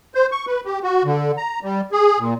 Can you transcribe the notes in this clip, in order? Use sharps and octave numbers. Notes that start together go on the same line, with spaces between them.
C5
C#6
B4
G4
F#4
D3
A#5
G3
G#4
A#2